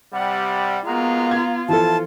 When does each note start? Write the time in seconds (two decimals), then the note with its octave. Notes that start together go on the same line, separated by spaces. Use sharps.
0.13 C3 G3 F#5
0.86 G#3 A#3 B3 F4 F#4 A#5
1.31 G#6
1.69 E3 F3 E4 F4 A4 A5